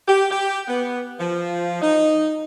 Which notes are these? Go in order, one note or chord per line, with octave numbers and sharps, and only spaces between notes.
G4
G4
B3
F3
D#4